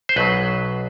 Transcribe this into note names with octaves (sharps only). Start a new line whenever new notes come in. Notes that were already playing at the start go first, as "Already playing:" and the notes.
C5
B1 B2 F#3 B4